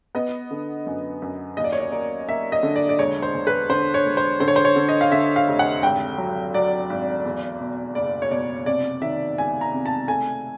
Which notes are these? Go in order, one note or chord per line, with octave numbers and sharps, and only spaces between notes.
B3 D#5
D3
F#2
F#2
D#2 D#5
D5
C#5
D5
A#3 D5
A#3 E5
D#5
D3
D5
D5
E1 C#5
C5
E1
B4
D3 C5
C#5
E1
C5
D3 C5
C#5
C5
C#5
D3
D#5
F5
D3 E5
F5
F1
F#5
G#1 G5
F#3
F#3 D5
G#1
E2
B2
F#1 D5
C#5
B2 D5
C3 D5
D#3 E5
C#2 G#5
A#5
C3
A5
A3 G#5